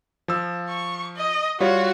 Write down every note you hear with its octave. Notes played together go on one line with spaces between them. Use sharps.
F3 E6
C#6
D#5
G3 F4 F#4 C#5